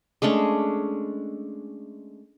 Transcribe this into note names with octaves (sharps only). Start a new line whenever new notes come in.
G#3 A3 C#4 D4